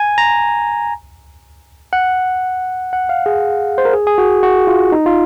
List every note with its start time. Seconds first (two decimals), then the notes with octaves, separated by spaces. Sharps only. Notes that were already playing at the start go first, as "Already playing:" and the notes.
Already playing: G#5
0.18 A#5
1.93 F#5
2.93 F#5
3.09 F5
3.26 G#4
3.78 C5
3.85 A#4
3.93 G#4
4.07 G#4
4.18 F#4
4.43 F#4
4.67 F4
4.92 D#4
5.06 F4